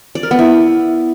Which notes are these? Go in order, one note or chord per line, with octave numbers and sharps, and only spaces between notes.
D5
A#4
B3
E4